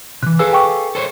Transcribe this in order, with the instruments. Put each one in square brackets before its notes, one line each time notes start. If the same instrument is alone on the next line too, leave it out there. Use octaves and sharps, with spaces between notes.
[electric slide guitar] C3 E3 [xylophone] F#6
[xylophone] G#4 B4 E6 [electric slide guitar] A4 F5 G#5
[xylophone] G5 C#6 D6
[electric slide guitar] A4 C5 C#5